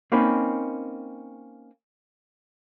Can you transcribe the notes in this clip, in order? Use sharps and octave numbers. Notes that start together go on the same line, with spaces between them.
A#3 C4 C#4 D#4 B4